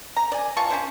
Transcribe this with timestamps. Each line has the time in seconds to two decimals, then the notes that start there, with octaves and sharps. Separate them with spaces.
0.16 A#5
0.32 D5 G#5
0.57 E3 F4 A5 C#6
0.70 C#4 E4 C5